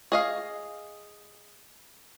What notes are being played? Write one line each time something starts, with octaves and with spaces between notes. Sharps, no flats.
G#4 D#5 F5